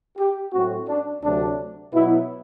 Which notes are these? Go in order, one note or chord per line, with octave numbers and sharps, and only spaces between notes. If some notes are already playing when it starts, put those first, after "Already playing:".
G4
A2 F#3 A3 C4 F#4
D4
D2 C3 F#3 A3 D4
B2 F#3 B3 E4